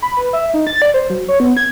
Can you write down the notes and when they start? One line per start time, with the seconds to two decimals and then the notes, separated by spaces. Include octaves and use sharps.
0.02 B5
0.17 B4
0.33 E5
0.54 D#4
0.67 A6
0.82 D5
0.94 C5
1.10 F#3
1.28 C#5
1.40 B3
1.57 G#6